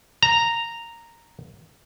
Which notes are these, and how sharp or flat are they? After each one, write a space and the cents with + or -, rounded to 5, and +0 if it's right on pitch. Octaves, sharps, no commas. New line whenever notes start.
A#5 -5